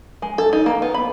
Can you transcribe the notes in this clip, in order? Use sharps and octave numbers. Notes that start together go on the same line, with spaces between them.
G#3
A4
D#4
A#3
B3
B5